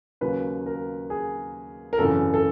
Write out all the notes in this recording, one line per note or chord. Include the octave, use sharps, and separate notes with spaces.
D#2 C#3 F#3 A#3 B4
A#4
G#4
A#4
G#1 F#2 C#3 E3 A4
A4